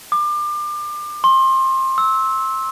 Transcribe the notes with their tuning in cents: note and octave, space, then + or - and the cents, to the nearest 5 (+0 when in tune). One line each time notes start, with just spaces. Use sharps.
D6 +30
C6 +25
E6 -15